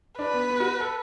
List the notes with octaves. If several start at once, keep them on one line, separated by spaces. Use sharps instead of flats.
D4 B4
B3
B3
F#4
A4